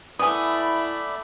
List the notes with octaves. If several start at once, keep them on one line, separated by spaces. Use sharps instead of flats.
A3 B3 E4 D5 G#5 B5 D#6